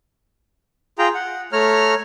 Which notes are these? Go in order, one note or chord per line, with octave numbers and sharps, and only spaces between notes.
F4 G#4 G5 A#5
F#5
A3 C#5 A#5 F6